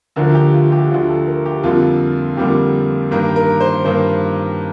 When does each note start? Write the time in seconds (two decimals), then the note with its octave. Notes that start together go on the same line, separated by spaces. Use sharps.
0.16 D2 D3 F3 A#4
0.35 G4
0.53 F4
0.72 G4
0.90 D2 D3 F3 F4
1.09 A4
1.27 A#4
1.46 G4
1.63 F2 D3 G3 A#3 F4
2.37 F2 D3 G3 A#3 G4
3.11 G2 D#3 A#3 A#4
3.36 A#4
3.60 C5
3.85 G2 D#3 A#3 C5